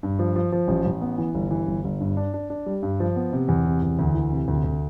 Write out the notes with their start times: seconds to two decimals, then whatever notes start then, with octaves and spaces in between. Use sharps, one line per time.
0.03 G2
0.19 F3
0.36 F3
0.52 F3
0.68 A1
0.85 A1
1.01 B3
1.18 E3
1.35 G1
1.51 E3
1.67 G1
1.84 G1
2.00 G2
2.17 D4
2.34 D4
2.50 D4
2.66 G3
2.83 G2
3.00 F3
3.16 B3
3.33 C3
3.48 E2
3.65 C3
3.82 E2
3.99 D2
4.15 E3
4.32 C3
4.48 D2
4.64 D2